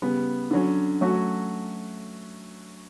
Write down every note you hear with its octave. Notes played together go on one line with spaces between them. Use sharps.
C#3 G3 B3
D3 F#3 C#4
F#3 A3 C#4 F#4